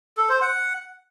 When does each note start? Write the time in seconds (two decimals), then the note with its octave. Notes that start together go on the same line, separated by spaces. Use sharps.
0.17 A4
0.29 C5
0.41 F#5